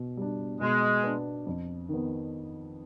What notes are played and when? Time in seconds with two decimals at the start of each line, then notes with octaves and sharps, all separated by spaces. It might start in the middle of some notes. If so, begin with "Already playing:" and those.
Already playing: B2
0.17 G3 D4
0.61 B2 G#3
1.04 B3 D4
1.47 F2
1.89 D#3 B3